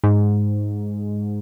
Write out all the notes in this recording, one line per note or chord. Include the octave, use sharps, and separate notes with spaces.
G#2